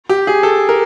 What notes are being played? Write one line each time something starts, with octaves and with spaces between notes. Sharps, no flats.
G4
G#4
A4
A#4